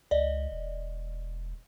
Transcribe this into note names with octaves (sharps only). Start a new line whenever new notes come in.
C#2 D5 D#5
E1